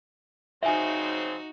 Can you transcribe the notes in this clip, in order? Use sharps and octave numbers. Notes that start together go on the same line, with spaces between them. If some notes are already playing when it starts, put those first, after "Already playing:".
C#3 F3 C4 D#4 F#4 E5 G#5